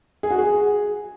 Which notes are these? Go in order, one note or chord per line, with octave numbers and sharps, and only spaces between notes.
G#4
F#4
G#4